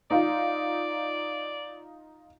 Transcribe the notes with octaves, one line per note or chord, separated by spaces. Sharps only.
D#4 F4 D5